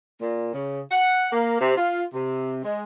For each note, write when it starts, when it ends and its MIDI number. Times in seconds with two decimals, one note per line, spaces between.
0.22 0.50 46
0.53 0.81 49
0.91 1.27 78
1.32 1.58 58
1.61 1.76 48
1.77 2.03 65
2.13 2.61 48
2.64 2.83 56